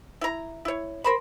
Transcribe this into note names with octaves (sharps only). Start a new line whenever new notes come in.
E4 A#5
E4 C#5
A#4 C5 B5